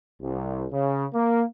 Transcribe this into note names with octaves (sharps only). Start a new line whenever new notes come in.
C2
C#3
A#3